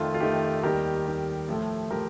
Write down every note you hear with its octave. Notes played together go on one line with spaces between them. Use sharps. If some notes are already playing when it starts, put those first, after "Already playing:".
Already playing: F2 D#3 A3 F4
F4
F2 D#3 A3 G4
D#2 D#3 G3 G4 A#4
D#2 D#3 G3
A2 F3 A3
A2 F3 G4 A#4